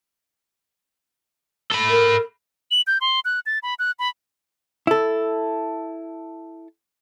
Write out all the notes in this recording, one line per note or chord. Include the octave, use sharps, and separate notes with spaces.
A4 B5
A#4
F#7
G6
C6
F#6
A6
B5
F#6
B5
E4 A4